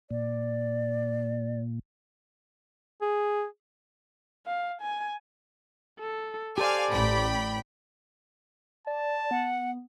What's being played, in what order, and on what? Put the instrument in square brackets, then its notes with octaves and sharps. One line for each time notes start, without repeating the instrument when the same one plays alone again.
[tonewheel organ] A#2 [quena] D5
[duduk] G#4
[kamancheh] F5
G#5
[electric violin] A4
[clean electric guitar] G4 A4 C5 [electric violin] D5 [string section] F5 G#5
[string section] A1 G5 B5
[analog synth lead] D5 [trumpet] A5
[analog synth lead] B3 [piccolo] F#5